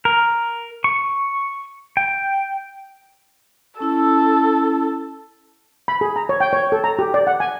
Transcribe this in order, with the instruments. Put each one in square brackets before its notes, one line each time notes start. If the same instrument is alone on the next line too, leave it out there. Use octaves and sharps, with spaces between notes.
[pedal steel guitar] A#4
C#6
G5
[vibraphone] C#4 E4 E6 [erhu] A4
[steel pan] B5
G#4
A#5
C#5
G5
C#5
A4
A#5
G4
D5
F#5
G#5